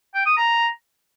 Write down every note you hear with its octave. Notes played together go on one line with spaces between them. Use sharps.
G5
D#6
A#5